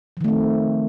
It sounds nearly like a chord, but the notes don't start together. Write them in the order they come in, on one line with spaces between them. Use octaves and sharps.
F3 D#3 A3 C4